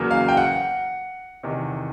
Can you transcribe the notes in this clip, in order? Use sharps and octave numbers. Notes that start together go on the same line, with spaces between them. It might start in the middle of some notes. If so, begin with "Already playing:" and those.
Already playing: E2 C#3 F#3 A#3
F5
G5
F#5
E2 C3 D#3